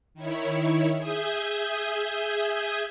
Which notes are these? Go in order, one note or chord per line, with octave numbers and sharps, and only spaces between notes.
D#3 E4 C#5
G#4 E5 D#6 G6 G#6